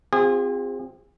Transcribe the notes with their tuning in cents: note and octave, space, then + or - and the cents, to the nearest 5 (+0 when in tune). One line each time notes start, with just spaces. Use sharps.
C4 +0 F4 +20 G#4 -35